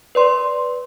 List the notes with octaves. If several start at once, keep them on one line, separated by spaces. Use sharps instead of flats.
B4 D5 C6